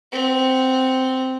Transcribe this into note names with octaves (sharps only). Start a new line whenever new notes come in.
C4 F#5